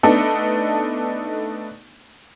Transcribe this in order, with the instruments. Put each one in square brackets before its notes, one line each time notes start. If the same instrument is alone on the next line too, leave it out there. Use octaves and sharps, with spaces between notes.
[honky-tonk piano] A3 B3 D4 D#4 A4